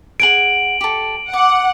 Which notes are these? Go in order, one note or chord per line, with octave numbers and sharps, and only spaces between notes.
G#4 F#5 G#5 D7 F#7
G4 A4
F#5 D6